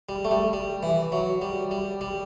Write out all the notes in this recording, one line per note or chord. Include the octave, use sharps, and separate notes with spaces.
G3
A3
G3
G3
E3
F#3
G3
G3
G3